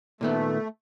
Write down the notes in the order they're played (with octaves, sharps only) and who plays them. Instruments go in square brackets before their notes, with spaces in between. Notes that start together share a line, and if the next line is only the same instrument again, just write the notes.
[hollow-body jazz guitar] A#2 D#3 B3 [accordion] A3